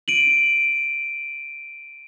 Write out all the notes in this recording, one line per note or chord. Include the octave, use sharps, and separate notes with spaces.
D7 D#7 F#7